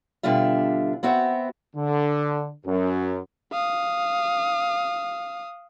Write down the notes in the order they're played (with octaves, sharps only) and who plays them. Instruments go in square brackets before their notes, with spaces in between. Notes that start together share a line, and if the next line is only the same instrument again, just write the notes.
[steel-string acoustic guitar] B2 D3 G3 D4 F4 E5
B3 C4 F#4 E5
[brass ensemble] D3
F#2
[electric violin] F5 D#6